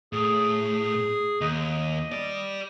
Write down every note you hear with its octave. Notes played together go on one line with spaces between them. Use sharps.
A2 G#4
D#2 D#5
G4 D5